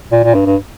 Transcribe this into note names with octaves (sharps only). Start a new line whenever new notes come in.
A#2
A#2
G2
G2